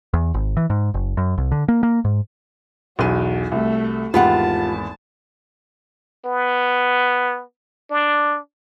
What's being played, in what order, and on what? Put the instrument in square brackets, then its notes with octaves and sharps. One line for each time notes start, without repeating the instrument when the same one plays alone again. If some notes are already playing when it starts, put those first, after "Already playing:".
[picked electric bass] E2
G#1
E3
G#2
F#1
F#2
C2
D3
A#3
A#3
G#2
[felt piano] B1 E2 D#7 [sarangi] F#4
[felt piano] C2 [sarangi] A3
[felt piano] G#1 E2 B5 [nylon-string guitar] F4 G4 F#5 [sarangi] A5
[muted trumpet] B3
D4